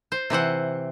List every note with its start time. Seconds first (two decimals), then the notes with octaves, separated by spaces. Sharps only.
0.12 C5
0.30 C3 E3 C5 F#5